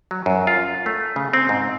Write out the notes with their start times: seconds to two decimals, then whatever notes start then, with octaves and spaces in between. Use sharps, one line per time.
0.11 F#3
0.26 F#2
0.47 F4
0.86 A3
1.16 C#3
1.33 C4
1.49 G#2